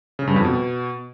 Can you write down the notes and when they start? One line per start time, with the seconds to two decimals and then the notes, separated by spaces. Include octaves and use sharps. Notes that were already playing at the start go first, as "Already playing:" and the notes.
0.19 C#3
0.27 G2
0.36 F2
0.45 B2